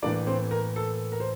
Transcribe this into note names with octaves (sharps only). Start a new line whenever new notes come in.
A2 E3 A#3 D4 D5
C4 C5
A#4
A4
A#4
C5